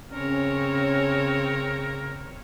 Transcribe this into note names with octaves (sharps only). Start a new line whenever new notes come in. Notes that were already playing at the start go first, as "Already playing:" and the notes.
C#3 C4 C#4 A#4 C#5